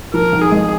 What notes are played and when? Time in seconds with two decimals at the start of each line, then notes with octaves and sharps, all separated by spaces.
0.14 F3 A#4
0.32 G#1
0.42 G#4
0.51 G#3